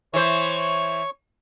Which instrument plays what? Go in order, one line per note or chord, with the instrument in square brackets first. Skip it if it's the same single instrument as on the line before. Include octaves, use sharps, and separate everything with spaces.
[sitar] E3 C5 [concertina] C#5 C#6